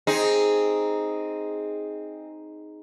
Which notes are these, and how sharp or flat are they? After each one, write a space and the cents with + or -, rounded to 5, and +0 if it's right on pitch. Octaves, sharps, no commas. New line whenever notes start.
C4 +0 D#4 +0 G#4 +0